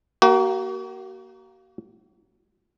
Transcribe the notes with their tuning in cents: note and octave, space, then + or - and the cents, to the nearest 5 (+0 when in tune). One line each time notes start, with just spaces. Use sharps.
A#3 +0 F#4 +40